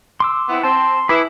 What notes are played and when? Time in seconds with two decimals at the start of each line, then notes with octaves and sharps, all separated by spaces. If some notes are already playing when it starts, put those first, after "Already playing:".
0.20 C6 D6 E6
0.49 B3 C4 E4 F#5
0.63 C4 A5 C6
1.09 E4 G#4 B4 B5 D6